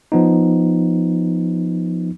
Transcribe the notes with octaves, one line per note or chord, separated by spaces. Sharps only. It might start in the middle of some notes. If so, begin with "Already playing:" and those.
F3 B3 D#4